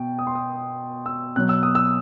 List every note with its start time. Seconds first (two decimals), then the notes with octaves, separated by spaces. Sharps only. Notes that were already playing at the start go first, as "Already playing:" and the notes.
Already playing: B2 G5
0.19 D#6
0.27 C6
0.35 D#6
1.06 E6
1.36 B2 F#3 F#6
1.49 E6
1.63 D#6
1.75 E6